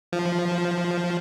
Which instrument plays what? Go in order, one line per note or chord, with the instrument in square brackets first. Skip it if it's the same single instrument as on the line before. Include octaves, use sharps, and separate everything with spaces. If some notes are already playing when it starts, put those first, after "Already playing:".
[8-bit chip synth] F3